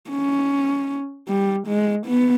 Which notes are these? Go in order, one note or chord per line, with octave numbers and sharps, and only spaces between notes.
C#4
G3
G#3
B3